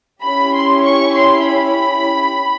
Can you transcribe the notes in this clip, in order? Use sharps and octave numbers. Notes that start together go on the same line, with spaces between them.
C#4 E4 G4 B5
C6
C#6
C6
B5